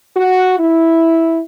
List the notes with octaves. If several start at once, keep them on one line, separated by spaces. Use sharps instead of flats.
F#4
E4